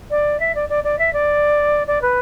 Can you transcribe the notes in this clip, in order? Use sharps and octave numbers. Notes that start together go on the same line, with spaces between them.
D5
E5
D5
D5
D5
E5
D5
D5
B4